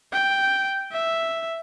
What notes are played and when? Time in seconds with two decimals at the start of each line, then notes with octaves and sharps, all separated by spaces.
0.12 G5
0.92 E5